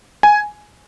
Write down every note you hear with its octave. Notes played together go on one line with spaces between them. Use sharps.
G#5